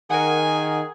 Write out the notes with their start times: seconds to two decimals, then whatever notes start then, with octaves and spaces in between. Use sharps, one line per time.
0.10 D#3 G#4 A#4 F#5 G#5